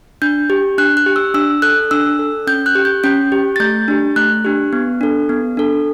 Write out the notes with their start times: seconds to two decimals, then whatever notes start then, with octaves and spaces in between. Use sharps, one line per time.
0.22 D4 G6
0.50 G4
0.78 D4 F#6
0.97 F#6
1.06 G4
1.16 E6
1.34 D4 E6
1.62 A4 F#6
1.91 D4 E6
2.19 A4
2.47 C#4 G6
2.66 F#6
2.75 G4
2.85 G6
3.04 C#4 G6
3.32 G4
3.56 A6
3.60 A3 G6
3.88 D4 G4
4.16 A3 F#6
4.45 D4 G4
4.73 B3
5.01 D4 A4
5.29 B3
5.57 D4 A4